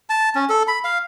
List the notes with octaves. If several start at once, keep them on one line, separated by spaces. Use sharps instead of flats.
A5
C#4
A4
B5
F5